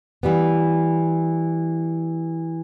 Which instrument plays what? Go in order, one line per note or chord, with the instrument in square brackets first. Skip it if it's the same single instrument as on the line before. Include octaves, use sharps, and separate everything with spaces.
[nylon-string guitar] E3 G3 B3